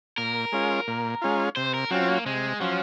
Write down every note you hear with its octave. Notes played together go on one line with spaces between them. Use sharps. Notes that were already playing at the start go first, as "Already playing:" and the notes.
A#2 A#4
G#3 C#4 F4
A#2
G#3 C#4 F4
C3 C5
A#4
F#3 C4 C#4 F4
A#3
C3 G#3
F3 F#3 C#4 F4